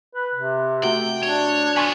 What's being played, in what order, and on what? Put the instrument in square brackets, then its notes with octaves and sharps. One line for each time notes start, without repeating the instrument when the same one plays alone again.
[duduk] B4
C3
[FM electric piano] A3 F#4 [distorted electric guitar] G5
[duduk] D4 [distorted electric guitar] C#5
[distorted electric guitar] B3 F4 [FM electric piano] G#5 C6 C#6